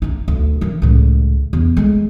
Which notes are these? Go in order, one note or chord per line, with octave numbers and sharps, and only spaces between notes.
D#4 E4
D2
D#3 E3
C#2 A2
E2
G#3 A3